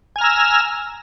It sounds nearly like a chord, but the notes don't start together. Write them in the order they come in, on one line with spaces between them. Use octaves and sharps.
G#5 F6 A#5 E6